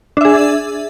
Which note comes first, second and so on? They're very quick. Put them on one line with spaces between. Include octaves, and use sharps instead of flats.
D4 E5 G#4